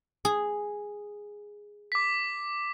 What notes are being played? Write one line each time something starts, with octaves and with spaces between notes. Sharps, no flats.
G#4
D6 B6